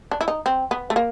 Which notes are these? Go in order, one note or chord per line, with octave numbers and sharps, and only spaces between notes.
D4
E4
D#4
C4
B3
A3
A#3